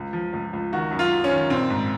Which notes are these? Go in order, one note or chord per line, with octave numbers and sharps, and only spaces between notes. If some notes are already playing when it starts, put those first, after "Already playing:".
Already playing: C#2
F3
C#2
C#2
D#3 F#4
F#2
F4
F#2
C#4
D#3
A#1 C4
G#2